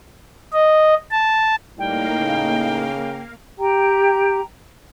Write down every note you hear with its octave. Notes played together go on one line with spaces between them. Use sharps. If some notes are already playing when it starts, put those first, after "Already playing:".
D#5
A5
A2 G3 A#3 D#4 A#4 F5 G5
C#3
G4 G5 A#5